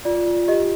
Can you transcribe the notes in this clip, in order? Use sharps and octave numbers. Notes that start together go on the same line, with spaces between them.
F4 D5
F4
G4 D#5